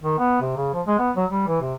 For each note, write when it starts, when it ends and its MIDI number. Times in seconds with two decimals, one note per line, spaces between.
0.03 0.19 51
0.19 0.41 59
0.41 0.56 48
0.57 0.73 49
0.73 0.82 53
0.87 0.95 56
0.99 1.11 59
1.16 1.25 54
1.31 1.46 55
1.47 1.60 52
1.62 1.74 48